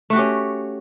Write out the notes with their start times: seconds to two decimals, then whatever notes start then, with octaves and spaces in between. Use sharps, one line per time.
0.10 A3
0.13 F#4
0.16 G4
0.19 C#4